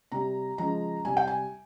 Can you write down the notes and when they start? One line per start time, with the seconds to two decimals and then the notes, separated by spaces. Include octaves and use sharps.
0.12 C3 G3 A#5
0.58 C#3 F3 G#3 A#5
1.05 C3 G3 G#5
1.17 G5
1.27 G#5